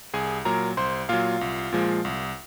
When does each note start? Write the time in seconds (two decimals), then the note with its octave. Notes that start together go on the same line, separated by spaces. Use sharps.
0.14 C2 G#4 G#5
0.45 A#2 F#3 A#4 A#5
0.77 C2 C5 C6
1.09 A#2 F#3 F4 F5
1.41 C2
1.72 A#2 F3 G#3
2.05 C2